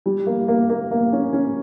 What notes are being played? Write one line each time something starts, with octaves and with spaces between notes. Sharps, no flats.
G3
A#3
A#3
A#3
A#3
C#4
C#4